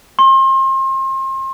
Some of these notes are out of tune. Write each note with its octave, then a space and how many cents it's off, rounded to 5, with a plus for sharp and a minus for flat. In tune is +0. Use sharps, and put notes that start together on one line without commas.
C6 +35